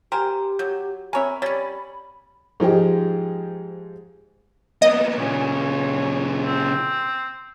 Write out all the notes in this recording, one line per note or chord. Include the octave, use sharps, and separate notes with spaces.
G4 A#4 C5 G5 G#5
F#3 G6
C4 A#4 C#5 E5 G#5 B5
G3 C#4 C#5 A6 B6
G#2 F3 G#3 G4
A#3 B3 D#5
A#2 C#3 C#5
C4